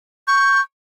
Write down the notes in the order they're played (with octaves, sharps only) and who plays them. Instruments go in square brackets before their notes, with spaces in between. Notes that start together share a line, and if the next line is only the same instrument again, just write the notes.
[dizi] C#6 [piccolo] G6